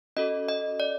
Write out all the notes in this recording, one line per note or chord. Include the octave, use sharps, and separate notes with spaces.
C#4 F#4 A4 D#5
D#5
D5